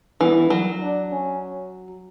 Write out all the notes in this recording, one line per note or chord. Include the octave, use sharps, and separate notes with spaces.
E3 B3
F#3
D4
C#4